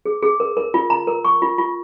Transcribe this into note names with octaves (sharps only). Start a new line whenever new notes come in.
G#4
G#4
A#4
A#4
F4
A#5
A#4
C#6
F4
F4